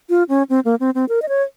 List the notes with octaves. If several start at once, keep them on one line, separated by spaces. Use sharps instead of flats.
F4
C#4
C4
A#3
C4
C4
A#4
D#5
C#5